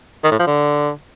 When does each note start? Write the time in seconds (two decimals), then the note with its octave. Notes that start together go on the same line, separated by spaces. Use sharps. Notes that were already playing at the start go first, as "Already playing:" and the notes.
0.24 D#3
0.31 A2
0.39 F3
0.47 D3